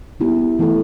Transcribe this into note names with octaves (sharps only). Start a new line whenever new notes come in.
G3 B3 E4 G4
E3 A3 E4 A4